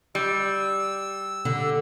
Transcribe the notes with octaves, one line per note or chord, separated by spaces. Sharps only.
G3 E6
D3